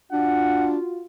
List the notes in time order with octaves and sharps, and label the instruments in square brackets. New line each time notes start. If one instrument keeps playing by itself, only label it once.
[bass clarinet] D4 [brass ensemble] F4 F#4 [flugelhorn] F#5